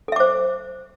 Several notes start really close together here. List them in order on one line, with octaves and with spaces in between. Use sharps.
A4 E5 D6 C5